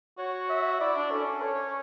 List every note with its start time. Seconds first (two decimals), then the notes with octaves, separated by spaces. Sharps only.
0.18 F#4 C#5
0.49 E5
0.80 E4 D5
0.96 D4
1.11 C#4 A4
1.42 C#5